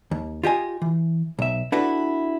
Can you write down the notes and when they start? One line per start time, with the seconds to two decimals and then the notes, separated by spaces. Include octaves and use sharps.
0.11 D#2
0.43 F4 G4 D#5 G#5
0.82 E3
1.39 B1 E5
1.72 D4 E4 F#4 A4 B4